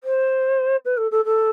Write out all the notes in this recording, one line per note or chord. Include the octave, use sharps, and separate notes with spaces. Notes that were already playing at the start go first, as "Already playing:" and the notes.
C5
B4
A4
A4
A4